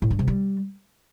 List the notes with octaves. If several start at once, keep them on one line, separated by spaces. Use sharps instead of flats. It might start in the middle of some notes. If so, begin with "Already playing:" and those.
A2
G2
C3
G3